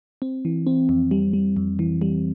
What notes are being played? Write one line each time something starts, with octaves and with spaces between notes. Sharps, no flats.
C4
E3
C4
F2
G3
G3
F2
E3
G3